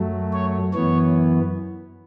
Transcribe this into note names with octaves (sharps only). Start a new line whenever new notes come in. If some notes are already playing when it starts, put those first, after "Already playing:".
Already playing: F#2 F#3 A3
C#5
F#2 E3 B3 C#5